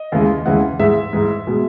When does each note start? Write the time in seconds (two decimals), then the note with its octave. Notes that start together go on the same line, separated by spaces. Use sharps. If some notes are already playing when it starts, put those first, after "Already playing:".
Already playing: D#5
0.12 D#2 C#3 E3 G#3
0.46 D#2 C#3 E3 G#3 F#5
0.80 G#2 E3 G#3 E5
1.13 G#2 E3 G#3
1.47 B2 G#3